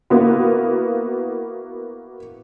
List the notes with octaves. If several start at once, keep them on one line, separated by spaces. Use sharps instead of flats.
A#3 B3 E4 F#4 B4